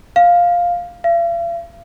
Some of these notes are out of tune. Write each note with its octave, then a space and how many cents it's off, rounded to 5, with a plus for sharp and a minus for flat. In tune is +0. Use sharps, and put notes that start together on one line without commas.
F5 +5
F5 -45